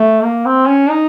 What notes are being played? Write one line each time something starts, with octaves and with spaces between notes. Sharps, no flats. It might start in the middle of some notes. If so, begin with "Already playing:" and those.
Already playing: A3
A#3
C4
C#4
D#4